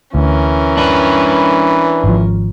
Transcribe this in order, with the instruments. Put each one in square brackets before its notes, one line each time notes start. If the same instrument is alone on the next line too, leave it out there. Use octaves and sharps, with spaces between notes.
[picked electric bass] D2 [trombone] E3 [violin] C#4 A#4
[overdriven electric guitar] D4 B4
[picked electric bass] G#1 F3